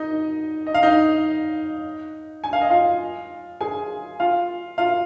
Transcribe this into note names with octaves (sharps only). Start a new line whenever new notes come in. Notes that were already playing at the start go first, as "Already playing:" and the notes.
Already playing: D#4 D#5
D#5
F5
D#4 D#5
G#5
F5
D#5
F4 F5
G#4 G#5
F4 F5
F4 F5